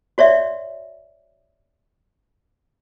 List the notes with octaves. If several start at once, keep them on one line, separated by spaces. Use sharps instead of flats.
F#4 C#5 D5 E5